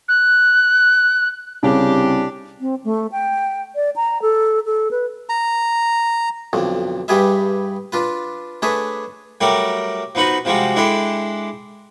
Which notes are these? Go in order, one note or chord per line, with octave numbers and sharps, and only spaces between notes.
F#6
C2 C#3 D4 G4
C4
A3
G5
D5
A#5
A4
A4
B4
A#5
B1 F2 D3
G2 G3 G4 G#4 B4 E5
D4 F4 B4
A3 D4 G#4 B4 C#5 E5
F#3 G3 A3 G4 A#4
F3 B3 D#4 F#4 B4
C3 F3 G3 G#3 F#4
G#3 D4 E4 G4 A4